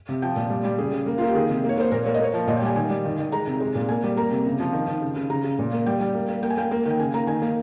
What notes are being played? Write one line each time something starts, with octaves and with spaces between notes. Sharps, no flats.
C3
F3 G5
A#2
G3
G3
C#3 G#4
C#3
A#3
F4
A#3
G4
D#3 G#4
C3
A#3
C#5
A#3 C5
A#2 A#4
A#3 C#5
D#5
A#3 C#5
F3
A#2 D#5
G5
G3 G#5
D#3 G#5
G3
D#3
D#3
G#3 A#5
C3
G#3
A#2
A#3 G#5
G3
A#3 A#5
C3
C#3
F3
D#3
D#3
C#3
C#3
C#3 A#5
C#3
A#2
A#3
G3 G5
G3
A#3
A#3
A#3 G5
G#5
A#3 G5
A#3
D#3 G5
C#3 G#5
A#3 A#5
D#3 G#5
A#3